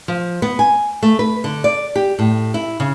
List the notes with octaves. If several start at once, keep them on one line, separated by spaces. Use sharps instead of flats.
F3
B3
G#5
A3
B4
D3
D5
G4
A2
E4
C#3